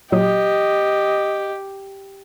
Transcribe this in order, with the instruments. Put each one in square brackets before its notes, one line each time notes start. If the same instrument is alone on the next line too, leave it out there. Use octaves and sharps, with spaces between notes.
[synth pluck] A#2 F#3 D#6 [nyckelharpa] G4 [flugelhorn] D#5